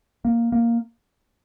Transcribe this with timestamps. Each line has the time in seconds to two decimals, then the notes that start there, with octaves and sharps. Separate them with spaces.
0.25 A#3
0.52 A#3